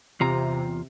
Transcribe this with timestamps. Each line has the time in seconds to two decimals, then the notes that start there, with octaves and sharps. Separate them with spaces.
0.20 E2 C3 F4 A#5